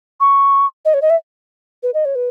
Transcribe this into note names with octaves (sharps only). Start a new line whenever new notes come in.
C#6
D#5
C#5
D#5
E5
B4
D#5
C#5
B4